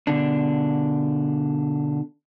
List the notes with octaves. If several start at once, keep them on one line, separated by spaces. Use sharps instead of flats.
B2 D3 D4